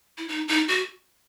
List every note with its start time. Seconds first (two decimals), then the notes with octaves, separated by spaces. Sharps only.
0.18 E4
0.28 D#4
0.48 D#4
0.68 F#4